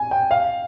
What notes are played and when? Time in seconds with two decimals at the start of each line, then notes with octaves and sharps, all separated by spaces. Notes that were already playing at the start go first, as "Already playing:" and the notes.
Already playing: G#5
0.11 G5
0.31 F5